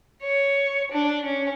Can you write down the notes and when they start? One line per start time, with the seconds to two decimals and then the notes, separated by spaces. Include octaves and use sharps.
0.23 C#5
0.91 D4
1.24 C#4